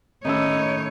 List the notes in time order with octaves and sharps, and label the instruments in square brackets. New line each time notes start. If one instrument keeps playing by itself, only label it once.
[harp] A2 D#3 [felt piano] C#4 E6 [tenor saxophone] D#4 [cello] C#5